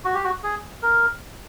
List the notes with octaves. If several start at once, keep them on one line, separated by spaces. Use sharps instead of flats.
F#4
G4
F#4
G#4
A#4